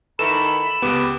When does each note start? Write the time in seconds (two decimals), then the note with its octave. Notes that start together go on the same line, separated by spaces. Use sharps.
0.19 D#3 E3 A4 B5 E7
0.82 C#2 B3 G4